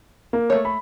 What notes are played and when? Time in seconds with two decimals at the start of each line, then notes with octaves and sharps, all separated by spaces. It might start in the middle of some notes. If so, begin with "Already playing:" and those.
0.33 A#3
0.50 A3 C#5
0.65 B5